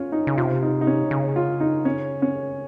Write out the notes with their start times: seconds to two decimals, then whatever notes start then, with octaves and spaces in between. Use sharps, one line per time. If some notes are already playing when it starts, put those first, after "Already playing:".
Already playing: C#4 F4
0.12 D#4
0.27 C#3
0.37 C3 F4
0.63 D#4
0.81 D#4
0.87 C#4
1.11 C#3
1.36 F4
1.60 D#4
1.85 C#4
2.22 C#4